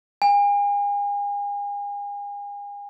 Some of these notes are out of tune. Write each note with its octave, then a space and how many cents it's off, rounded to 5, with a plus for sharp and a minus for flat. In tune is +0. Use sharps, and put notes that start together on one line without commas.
G#5 -40